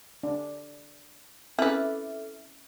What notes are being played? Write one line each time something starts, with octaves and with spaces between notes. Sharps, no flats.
D4
C4 C#4 E4 A4 B4 E5 F6